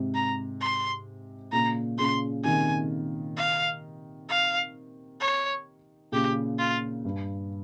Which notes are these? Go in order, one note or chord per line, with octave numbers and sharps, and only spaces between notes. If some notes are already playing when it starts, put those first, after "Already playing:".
Already playing: G#2 C3
A#5
C6
A#2 C#3 A#5
A#2 C#3 C6
C3 D#3 G#5
F5
F5
C#5
A#2 C#3 G4
F4
G2